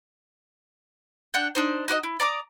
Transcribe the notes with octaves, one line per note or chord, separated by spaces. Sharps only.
D4 F#5 G5
D4 D#4 C5
D#4 F#4 D5 D#5
E4
D5 A#5 D6 D#6